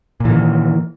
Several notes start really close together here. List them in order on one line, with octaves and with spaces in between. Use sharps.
A#2 E3 D#3